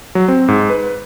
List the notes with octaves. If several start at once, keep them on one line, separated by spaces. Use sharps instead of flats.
F#3
C4
G#2
B4